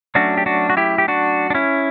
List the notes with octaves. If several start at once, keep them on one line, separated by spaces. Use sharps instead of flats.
F#3 A3 C#4 D4 F#4
G4
D4 F#4
F#4
E4 G4
G4
D4 F#4
D4
C#4 E4